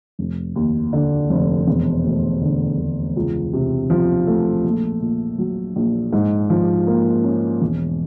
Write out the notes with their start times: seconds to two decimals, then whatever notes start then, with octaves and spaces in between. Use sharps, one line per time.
0.19 F1
0.56 D#2
0.93 D3
1.30 F1
1.67 E1
2.04 D2
2.41 D3
2.79 E1
3.16 C#2
3.53 C3
3.90 F3
4.27 A3
4.64 A#1
5.01 A#2
5.38 F#3
5.76 A#1
6.13 G#2
6.50 F3
6.87 A#3
7.24 C#4
7.61 E1